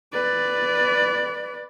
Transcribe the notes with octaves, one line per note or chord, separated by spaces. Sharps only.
B4 D5